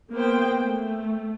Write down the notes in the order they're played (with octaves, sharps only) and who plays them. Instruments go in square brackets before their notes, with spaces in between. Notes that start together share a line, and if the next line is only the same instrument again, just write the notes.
[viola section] A#3 B3 C5 G5
A3